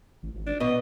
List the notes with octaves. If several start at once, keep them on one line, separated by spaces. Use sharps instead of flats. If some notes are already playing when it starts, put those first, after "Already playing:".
A1
G#1
D4
B2 B3 D#5